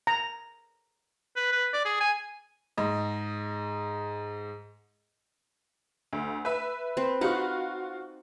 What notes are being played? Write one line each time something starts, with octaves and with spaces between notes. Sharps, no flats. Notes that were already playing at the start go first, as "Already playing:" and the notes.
A#5
B4
B4
D5
G#4
G#5
G#2 D#5
D2
B4 E5
C4 B4
D#4 F4 F#4 F#5